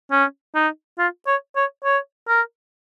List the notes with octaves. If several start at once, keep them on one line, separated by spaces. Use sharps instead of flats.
C#4
D#4
F4
C#5
C#5
C#5
A#4